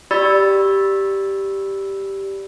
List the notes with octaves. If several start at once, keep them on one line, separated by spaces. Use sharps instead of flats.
G4 D5 B5 E6 A6